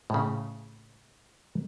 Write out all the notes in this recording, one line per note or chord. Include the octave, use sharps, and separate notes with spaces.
A2 C#3